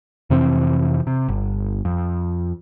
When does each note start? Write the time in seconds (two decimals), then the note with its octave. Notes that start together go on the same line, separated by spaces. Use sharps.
0.30 F2 C3 E3 C4
1.07 C3
1.29 G1
1.85 F2